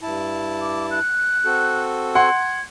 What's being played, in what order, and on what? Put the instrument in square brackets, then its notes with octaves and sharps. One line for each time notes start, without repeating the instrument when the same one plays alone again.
[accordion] G2 E4 A5
[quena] D6
F#6
[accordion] C4 F#4 A4
[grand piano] F#5 C6 [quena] G#6